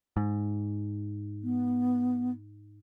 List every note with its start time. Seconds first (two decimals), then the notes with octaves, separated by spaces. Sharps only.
0.17 G#2
1.43 B3